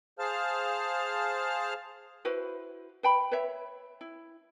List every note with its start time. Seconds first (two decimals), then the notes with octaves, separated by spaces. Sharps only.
0.19 G#4 C5 F5 A5 F6
2.25 E4 F#4 B4 C5
3.03 B4 G5 B5
3.32 B4 C#5 E5
4.01 E4